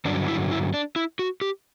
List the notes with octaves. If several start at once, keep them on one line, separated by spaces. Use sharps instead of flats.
G2 D3 F#3 C#4 D4
E4
E4
D4
E4
F#4
G4